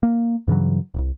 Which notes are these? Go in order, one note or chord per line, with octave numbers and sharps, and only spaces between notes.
A#3
G2 C#3 E3 F#3
D1 C2